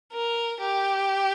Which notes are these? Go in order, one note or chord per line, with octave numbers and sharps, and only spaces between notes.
A#4
G4